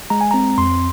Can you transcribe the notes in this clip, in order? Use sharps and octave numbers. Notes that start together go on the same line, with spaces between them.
G#3 A#5
G#5
C4 A#5
F2 C6